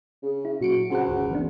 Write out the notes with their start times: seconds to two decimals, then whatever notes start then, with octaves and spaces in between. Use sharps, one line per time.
0.22 C#3
0.45 E4
0.61 A#2 F#3 C#7 D7
0.90 C#2 F#4 C5 F#5
1.08 G1 D2
1.31 E3 B3 D4